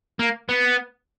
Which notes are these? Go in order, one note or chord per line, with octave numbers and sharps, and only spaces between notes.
A#3
B3